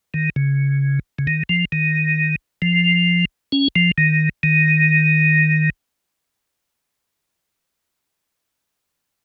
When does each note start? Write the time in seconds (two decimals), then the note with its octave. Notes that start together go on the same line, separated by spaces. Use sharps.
0.14 D#3
0.36 C#3
1.19 C#3
1.27 D#3
1.49 F3
1.72 D#3
2.62 F3
3.52 C#4
3.76 F3
3.98 D#3
4.43 D#3